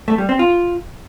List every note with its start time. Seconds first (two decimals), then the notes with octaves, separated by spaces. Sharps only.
0.08 A3
0.18 G3
0.29 C4
0.39 F4